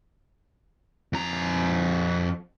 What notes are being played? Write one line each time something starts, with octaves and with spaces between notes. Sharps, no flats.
F2 A#5